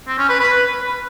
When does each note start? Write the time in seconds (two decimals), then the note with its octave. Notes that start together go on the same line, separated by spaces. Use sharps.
0.08 C4
0.18 C#4
0.29 B4
0.40 B4